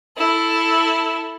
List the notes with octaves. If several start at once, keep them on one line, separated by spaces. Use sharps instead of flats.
E4 A4